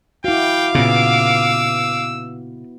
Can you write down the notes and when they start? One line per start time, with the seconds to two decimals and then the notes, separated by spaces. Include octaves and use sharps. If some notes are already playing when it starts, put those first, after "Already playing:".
0.24 E4 F#4 F5 G5 D6
0.75 A#2 C#3 B3 E6